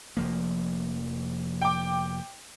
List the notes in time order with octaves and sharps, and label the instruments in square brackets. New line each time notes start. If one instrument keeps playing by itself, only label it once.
[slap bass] F1 F3 A#3
[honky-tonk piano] G5 D6